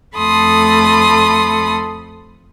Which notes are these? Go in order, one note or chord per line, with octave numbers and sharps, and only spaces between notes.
F2 A3 A4 B5 C6 D#6